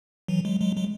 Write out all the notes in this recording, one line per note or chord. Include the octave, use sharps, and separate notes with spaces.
E3 F#3
F#3 G#3
F#3 G#3
F#3 G#3